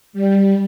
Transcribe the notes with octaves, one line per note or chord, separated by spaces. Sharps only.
G3